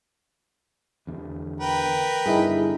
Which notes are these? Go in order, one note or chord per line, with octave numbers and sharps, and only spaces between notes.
E2 D3
A#4 B4 G5
G2 D3 D#4 E4 G#4